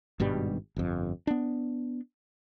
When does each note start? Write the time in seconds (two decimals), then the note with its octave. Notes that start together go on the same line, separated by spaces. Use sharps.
0.20 G#1 G2 B2 G3
0.76 G1 F2
1.27 B3 D4